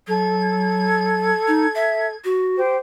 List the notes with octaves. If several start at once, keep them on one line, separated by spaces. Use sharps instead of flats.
F#3 A4 G#6
D#4
E5
F#4
G4 C5